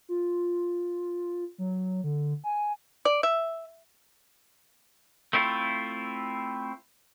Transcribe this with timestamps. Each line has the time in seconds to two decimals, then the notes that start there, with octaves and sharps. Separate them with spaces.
0.09 F4
1.58 F#3
2.04 D3
2.44 G#5
3.05 D5
3.23 E5
5.33 A3 C4 E4 F4